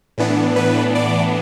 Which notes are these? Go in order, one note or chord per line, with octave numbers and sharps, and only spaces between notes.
A2 E3 B3 D4
B4
D5